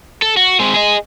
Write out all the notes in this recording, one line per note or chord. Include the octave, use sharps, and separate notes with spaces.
A4
F#4
G#3 C4
G#4 D#5